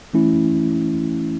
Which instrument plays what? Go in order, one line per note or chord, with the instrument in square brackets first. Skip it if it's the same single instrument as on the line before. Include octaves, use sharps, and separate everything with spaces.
[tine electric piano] E3 A3 C#4 E4